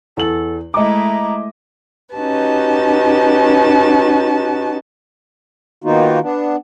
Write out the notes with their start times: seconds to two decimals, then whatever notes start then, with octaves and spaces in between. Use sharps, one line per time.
0.17 E2 A4 F#7
0.74 G#3 A3 E4 D#5 A#5 D6
2.14 C#4 D#4 F#4 G4 B4 A5
5.84 D#3 A#3 B3 D#4 F4 F#4
6.22 B3 D4